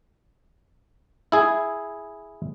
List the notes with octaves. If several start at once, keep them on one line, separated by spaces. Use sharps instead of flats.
E4 G#4